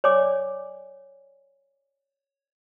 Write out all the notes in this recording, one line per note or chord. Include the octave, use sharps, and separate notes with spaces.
C#5 D5 G#5 D6